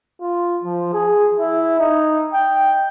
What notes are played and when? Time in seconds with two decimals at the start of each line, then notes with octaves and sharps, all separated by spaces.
0.22 F4
0.64 F3
0.94 G#4
1.40 E4
1.80 D#4
2.34 G5